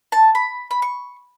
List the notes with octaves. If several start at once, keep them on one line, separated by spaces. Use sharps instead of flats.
A5
B5
B5
C#6